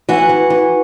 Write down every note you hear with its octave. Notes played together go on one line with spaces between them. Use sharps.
E3 F#4
E3
E3